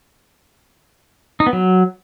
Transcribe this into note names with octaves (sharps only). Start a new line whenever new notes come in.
D#4
B3
F#3